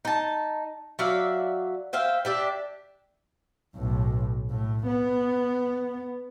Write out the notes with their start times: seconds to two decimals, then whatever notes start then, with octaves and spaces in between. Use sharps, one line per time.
0.05 D#4 A5
0.99 F#3 D5 E5 F5
1.93 C5 E5 F5 G5
2.25 D4 G4 E5
3.76 B1 A2
4.50 A2
4.87 B3